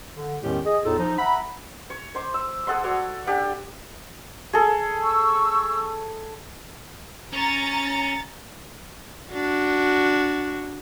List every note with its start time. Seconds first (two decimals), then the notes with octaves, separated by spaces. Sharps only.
0.17 D3
0.43 E2 A2 D#3 G#3 C#4 G4
0.65 G#4 D#5
0.84 E2 A2 D#4 F4 A4
0.99 F3 D#4
1.18 E5 F#5 A#5 B5
1.90 C#5
2.15 C5 C6 D6
2.34 E6
2.67 G#4 A4 F#5 C6
2.84 F#4 A4 C#5 D5
3.27 D4 G4 F#5
4.53 G#4 A4
5.02 C#6 E6
7.33 C#4 C#5 A#5 A6
9.32 D4 F#4